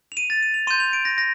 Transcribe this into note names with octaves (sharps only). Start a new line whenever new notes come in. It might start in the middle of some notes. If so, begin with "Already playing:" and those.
F7
D#7
A6
D#7
F7
C6 G6 D#7
F7
D7
A#6
A#6